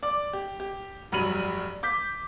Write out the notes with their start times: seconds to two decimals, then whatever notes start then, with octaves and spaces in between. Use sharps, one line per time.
0.03 D5 D6
0.33 G4
0.60 G4
1.12 F1 G2 F#3 B5 D#7 F#7
1.83 D6 G6 B6